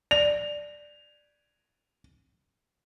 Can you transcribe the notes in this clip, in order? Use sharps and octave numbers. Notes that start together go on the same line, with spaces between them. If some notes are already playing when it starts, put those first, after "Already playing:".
D5 F7